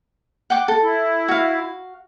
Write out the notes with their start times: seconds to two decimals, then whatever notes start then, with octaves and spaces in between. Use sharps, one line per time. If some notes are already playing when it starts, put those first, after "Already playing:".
0.50 F#5 G5 D6
0.68 A4
0.83 E4
1.28 F#4 F5